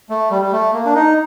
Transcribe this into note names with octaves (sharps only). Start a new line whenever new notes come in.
A3
G3
G3
A3
A#3
D4
D#4